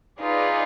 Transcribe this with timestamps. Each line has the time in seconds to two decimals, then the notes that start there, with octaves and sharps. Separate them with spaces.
0.21 D#4 F4 G#4 B4 D5